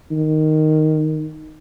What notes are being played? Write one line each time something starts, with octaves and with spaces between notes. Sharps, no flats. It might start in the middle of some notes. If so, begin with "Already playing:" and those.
D#3